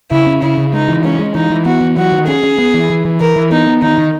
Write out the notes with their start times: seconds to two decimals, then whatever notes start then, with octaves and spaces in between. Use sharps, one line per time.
0.11 C#3 E4
0.27 C#4
0.42 C#3 E4
0.58 C#3
0.73 G#3 D#4
0.88 E3
1.04 G#3 C#4
1.19 G#3
1.35 E3 D#4
1.50 E3
1.65 B3 F#4
1.81 E3
1.97 F#3 F#4
2.12 D#3
2.27 C#4 G#4
2.44 C#4
2.58 B3
2.74 E3
2.90 E3
3.05 E3
3.21 E3 A#4
3.36 E3
3.51 B3 D#4
3.67 B3
3.82 D#3 D#4
3.98 D#3